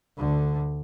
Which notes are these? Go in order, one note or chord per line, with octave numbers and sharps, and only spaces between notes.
D2 D3